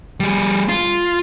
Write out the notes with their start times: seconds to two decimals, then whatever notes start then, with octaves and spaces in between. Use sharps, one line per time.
0.20 G3 G#4
0.69 F4